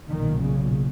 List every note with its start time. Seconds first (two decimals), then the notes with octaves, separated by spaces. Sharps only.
0.10 B1 A#2 D#3
0.41 C#3